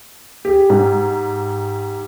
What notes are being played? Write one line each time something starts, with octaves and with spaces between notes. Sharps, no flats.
G4 G#4
G#2